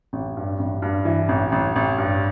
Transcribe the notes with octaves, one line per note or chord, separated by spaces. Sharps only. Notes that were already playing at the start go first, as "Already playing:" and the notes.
A1
G2
A1
G2
E3
A1
A1
A1
G2